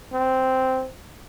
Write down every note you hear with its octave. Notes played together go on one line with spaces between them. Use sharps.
C4